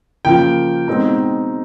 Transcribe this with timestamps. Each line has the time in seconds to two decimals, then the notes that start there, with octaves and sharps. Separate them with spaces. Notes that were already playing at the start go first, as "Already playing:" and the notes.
0.25 C#3 F3 A#3 G5
0.88 B2 G#3 C4 D#4